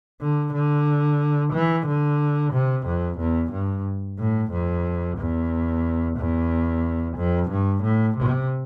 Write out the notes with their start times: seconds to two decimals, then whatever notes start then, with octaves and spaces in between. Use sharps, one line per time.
0.21 D3
0.53 D3
1.53 E3
1.87 D3
2.53 C3
2.86 F2
3.19 E2
3.52 G2
4.19 A2
4.52 F2
5.18 E2
6.18 E2
7.17 F2
7.50 G2
7.83 A2
8.17 C3